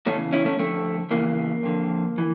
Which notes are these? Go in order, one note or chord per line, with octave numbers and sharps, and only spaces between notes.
E2 C#3 E3 A3 C#4
C#4 E4
A3 C#4
F2 D3 A3
E2 C#3 E3 A#3
F2 D3
E3